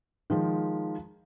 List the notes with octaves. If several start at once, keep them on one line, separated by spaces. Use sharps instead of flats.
D#3 F3 G#3